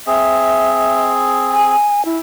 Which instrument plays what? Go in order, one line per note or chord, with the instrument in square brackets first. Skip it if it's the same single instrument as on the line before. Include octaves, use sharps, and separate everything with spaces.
[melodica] C4 G#4 [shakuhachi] E5
[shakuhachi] G#5
E4